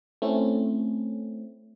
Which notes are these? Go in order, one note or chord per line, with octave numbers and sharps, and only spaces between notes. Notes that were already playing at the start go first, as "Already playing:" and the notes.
A3 C4 C#4 E4